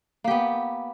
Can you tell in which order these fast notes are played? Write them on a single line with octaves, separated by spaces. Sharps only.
A#3 G4 B3